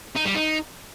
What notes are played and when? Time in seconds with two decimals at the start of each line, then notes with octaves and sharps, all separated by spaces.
0.16 D#4
0.26 G3
0.35 D#4